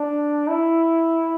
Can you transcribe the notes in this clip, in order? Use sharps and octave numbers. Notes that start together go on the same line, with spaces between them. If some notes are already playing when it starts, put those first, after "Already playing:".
Already playing: D4
E4